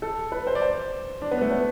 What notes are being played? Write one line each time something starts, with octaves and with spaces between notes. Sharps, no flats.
A4
B4
C5
D5
C5
D4
B3
A3
B3